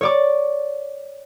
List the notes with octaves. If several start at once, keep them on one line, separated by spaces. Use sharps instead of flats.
C#5 D5 D6